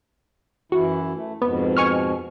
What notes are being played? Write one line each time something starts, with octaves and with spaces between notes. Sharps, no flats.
F#2 E3 E4 F#4
A3
F2 G#2 B2 B3
G#5 C#6 F6